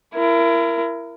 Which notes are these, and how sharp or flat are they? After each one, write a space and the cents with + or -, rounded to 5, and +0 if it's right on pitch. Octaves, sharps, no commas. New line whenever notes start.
E4 +30 A#4 +0